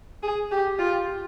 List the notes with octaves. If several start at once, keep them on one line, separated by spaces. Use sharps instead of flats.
G#4
G4
F4